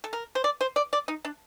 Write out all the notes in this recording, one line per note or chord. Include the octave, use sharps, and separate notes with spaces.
A4
A#4
C5
D5
C5
D5
D5
D#4
D4